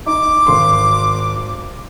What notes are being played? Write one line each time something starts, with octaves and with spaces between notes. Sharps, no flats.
D#4 D6
G#1 C6